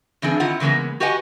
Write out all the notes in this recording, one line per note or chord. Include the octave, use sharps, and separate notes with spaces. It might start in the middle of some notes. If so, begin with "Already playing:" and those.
G2 E3 C4 D4 G#4
D#3 C4 E4 F4 F#5
C#3 E3 G#3 A#3 B3
F#4 G4 B4 D#5 F#5 G#5